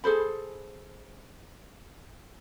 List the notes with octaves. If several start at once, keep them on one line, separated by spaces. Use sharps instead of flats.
G#4 A4 C5 B5